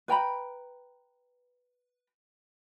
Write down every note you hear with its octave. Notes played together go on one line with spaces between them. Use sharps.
B4 G5 A#5 B5